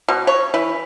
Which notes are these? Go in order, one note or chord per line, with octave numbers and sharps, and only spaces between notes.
B2
C#5
E3